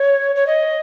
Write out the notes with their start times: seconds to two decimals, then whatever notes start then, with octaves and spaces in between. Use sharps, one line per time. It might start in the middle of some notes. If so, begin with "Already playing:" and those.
Already playing: C#5
0.35 C#5
0.47 D#5